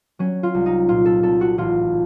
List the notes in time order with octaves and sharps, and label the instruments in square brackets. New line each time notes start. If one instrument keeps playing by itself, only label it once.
[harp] F#3 C#4
F4
C2
D#4
A#2 F4
A4
C2 A4
F#4
A1 F4